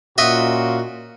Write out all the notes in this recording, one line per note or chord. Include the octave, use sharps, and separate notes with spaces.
A#2 C#4 F4 F#4 D#5 E5